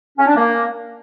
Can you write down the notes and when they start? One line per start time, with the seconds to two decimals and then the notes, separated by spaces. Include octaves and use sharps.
0.18 C#4
0.27 D4
0.36 A#3